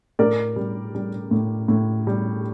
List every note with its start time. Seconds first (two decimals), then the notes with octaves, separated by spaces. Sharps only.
0.19 A2 A#4 D5
0.56 G3
0.95 G3
1.31 A2
1.68 A2
2.07 G3